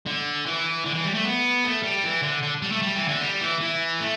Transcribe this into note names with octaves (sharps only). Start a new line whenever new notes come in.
D3
E3
D3
E3
G3
A3
B3
A3
G3
E3
D3
D3
G3
A3
G3
E3
D3
G3
E3
E3
A3